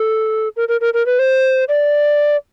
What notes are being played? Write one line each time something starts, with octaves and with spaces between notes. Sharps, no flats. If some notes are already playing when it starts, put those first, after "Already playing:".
Already playing: A4
A#4
A#4
A#4
A#4
B4
C5
D5